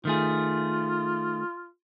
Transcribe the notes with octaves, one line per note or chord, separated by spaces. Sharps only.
D#3 A3 F4 G#4